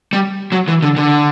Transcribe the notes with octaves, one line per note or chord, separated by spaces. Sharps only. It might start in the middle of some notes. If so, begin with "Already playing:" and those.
G3
F#3
E3
D3
D3